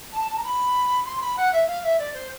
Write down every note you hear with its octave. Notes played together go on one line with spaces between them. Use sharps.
A5
A5
A#5
B5
C6
B5
F#5
E5
F5
E5
D5
C5